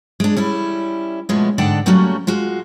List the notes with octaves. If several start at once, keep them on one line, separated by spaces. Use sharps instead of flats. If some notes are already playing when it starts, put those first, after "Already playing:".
G#3 D4
G3 C#4 E4
B2 F3 G#3 A3 B3 C#4
G#2 D3 D5 F#5 G5 A5
F#3 G3 A3 A#3 C#4 F#4
G#3 F4 F#4